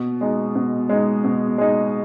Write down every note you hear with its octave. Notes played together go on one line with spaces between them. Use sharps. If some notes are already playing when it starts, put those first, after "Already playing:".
Already playing: B2
G#3 D#4
B2
G#3 D#4
B2
G#3 D#4